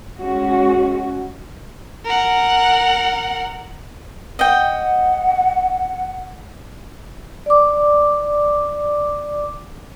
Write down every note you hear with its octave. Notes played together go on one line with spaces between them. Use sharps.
G#3 C#4 F#4
A#4 F#5
D#5 F#5 G5
D5 D6